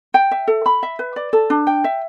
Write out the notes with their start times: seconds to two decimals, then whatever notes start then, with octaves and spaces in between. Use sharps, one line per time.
0.14 G5
0.31 E5
0.48 A4
0.66 B5
0.83 E5
0.99 B4
1.16 D5
1.33 A4
1.50 D4
1.67 G5
1.84 E5